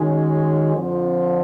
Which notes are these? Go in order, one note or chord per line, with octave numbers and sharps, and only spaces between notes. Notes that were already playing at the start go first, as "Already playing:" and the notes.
Already playing: D#3 G#3 C#4 F#4
F2 D3 F3